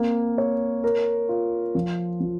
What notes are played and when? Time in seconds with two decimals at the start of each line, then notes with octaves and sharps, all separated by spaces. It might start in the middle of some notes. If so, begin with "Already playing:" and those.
Already playing: A#3 C4
0.38 C#5
0.84 A#4
1.29 F4
1.75 F3
2.20 F3